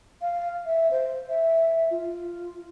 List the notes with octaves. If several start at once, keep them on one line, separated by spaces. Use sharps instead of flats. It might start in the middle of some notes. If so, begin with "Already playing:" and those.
F5
E5
C5
E5
F4